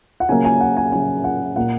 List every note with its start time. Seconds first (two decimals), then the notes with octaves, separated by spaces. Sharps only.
0.20 F#5
0.29 C#3 F#3 A#3 G#5
0.45 G#5
0.61 F#5
0.77 G#5
0.92 C#3 F#3 A#3 G#5
1.24 F#5
1.56 A#2 A#3 F#5